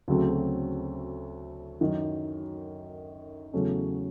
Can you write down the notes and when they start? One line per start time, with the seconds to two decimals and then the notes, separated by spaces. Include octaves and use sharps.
0.08 D2 C#3 F#3 A3 C4
1.81 F#2 D#3 F#3
3.53 E2 C#3 F#3 A3 C#4